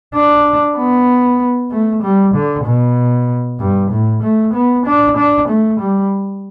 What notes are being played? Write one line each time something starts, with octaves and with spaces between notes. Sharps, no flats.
D4
B3
A3
G3
D3
B2
G2
A2
A3
B3
D4
D4
A3
G3